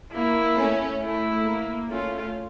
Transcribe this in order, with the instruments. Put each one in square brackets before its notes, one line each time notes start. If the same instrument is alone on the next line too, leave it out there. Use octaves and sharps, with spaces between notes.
[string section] A#3 [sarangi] E4
[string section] A3 C#4
[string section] A3 [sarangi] E4
[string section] A#3
[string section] A3 C#4 [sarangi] F4